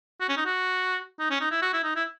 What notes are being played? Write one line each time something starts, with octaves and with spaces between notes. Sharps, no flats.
F#4
C#4
D#4
F#4
D#4
C#4
D#4
E4
F#4
E4
D#4
E4